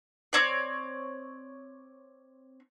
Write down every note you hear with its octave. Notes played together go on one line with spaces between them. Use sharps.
C4 C#5 D5